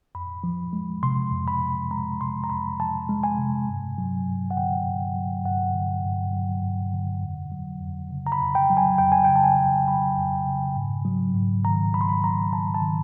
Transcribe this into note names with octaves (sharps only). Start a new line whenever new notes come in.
F2 B5
F3
G#3
C3 C6
F2
B5
F3
G#3 A#5
C3 C6
A#5
F2 B5
F3 A5
G#3
G#5
C3
G2
F#3
G2
F#5
D3 G5
G2
F#3
G2 F#5
D3
G2
F#3
G2
D3
F2
F#3
F2
C#3
A#5
B5
F2
G5
F#3
G#5
F2 G5
G#5
C#3 G5
A5
G#5
F2
F#3 B5
F2
C#3
G#2
F#3
G#2
D#3 A#5
G#2 B5
C6
B5
F#3 A#5
G#2 A5
A5
D#3